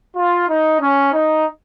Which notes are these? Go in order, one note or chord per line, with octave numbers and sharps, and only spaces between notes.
F4
D#4
C#4
D#4